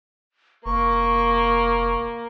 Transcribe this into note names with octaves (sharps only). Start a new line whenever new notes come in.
F1 A#3 C#6